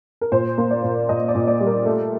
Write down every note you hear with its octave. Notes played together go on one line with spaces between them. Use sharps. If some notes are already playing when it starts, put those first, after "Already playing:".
A#4
A#2 C5
A#3
D5
A#2
A#2 D#5
D5
A#2
D5
G3
A#4
A3